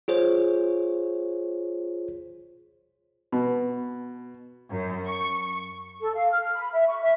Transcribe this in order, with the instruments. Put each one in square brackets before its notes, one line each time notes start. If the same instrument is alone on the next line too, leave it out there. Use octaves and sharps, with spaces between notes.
[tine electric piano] F4 G#4 C5 C#5
[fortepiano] B2
[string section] F#2
C#6
[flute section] A4
F5
F6
F6
B5
E5
C#6
E5